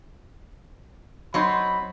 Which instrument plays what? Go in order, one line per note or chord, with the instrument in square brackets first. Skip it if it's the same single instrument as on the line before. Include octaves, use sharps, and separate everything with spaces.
[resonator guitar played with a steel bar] F#3 C4 D#4 [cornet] B5